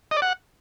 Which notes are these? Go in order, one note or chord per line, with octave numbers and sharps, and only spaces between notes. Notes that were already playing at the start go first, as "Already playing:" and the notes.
D#5
D5
F#5